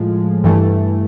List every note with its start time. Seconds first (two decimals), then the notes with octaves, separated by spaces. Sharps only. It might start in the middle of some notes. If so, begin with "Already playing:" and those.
Already playing: A2 F3 G#3
0.44 G2 E3 A3